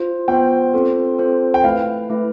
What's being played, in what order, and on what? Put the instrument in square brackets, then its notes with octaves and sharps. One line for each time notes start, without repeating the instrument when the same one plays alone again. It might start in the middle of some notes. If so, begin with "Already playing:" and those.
Already playing: [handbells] F4 C5
[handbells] B3 F4 C5 [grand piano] G5
[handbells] C4 F4 A4 C5
C4 F4 A4 C5
[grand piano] G5
[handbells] A3 E4 B4 [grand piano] F5
[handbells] A3 E4 B4